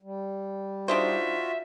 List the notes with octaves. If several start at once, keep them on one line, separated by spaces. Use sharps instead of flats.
G3
D4 D#4 F4 F#4 C5 E5